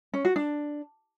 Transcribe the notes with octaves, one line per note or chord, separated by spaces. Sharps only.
C#4
F#4
D4